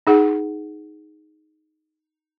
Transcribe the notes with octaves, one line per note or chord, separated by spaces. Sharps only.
D#4 G#4 F#5